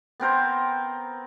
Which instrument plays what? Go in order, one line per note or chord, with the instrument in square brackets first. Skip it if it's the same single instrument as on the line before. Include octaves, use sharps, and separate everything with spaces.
[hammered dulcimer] B3 C4 A#4 C5